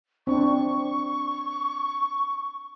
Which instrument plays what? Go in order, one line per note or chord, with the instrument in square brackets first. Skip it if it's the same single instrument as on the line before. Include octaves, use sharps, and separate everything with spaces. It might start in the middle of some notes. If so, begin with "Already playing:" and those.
[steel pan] C4 D4 [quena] C#6